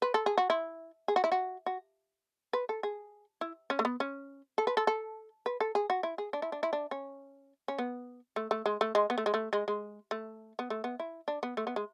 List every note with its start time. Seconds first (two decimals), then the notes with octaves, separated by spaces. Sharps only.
0.02 B4
0.14 A4
0.26 G#4
0.38 F#4
0.50 E4
1.08 G#4
1.16 F#4
1.24 E4
1.32 F#4
1.66 F#4
2.53 B4
2.69 A4
2.83 G#4
3.41 E4
3.70 C#4
3.79 A3
3.85 B3
4.00 C#4
4.58 A4
4.67 B4
4.77 A4
4.87 A4
5.46 B4
5.60 A4
5.75 G#4
5.90 F#4
6.03 E4
6.18 G#4
6.33 D4
6.42 E4
6.52 D4
6.63 E4
6.73 D4
6.91 C#4
7.68 C#4
7.78 B3
8.36 A3
8.51 A3
8.66 G#3
8.81 A3
8.95 G#3
9.10 B3
9.18 A3
9.26 G#3
9.34 A3
9.53 G#3
9.68 G#3
10.11 A3
10.59 B3
10.70 A3
10.84 B3
11.00 E4
11.28 D4
11.43 B3
11.57 A3
11.67 B3
11.76 G#3